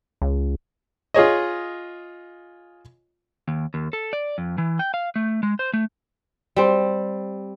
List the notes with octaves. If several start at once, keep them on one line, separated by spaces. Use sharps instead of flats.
C#2
F4 G#4 C#5 D#5
D#2
D#2
A4
D5
F2
E3
G5
F5
A3
G#3
C5
A3
G3 C4